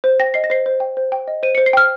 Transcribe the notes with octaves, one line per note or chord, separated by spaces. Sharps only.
C5
G5 A#6
D#5 C7
A#6
C5 C7
C5
G5
C5
G5
D#5
C5 D#7
C5 C#7
C7
G5 F6